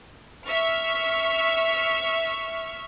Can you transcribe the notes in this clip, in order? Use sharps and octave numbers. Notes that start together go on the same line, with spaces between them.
E5 C#6 F6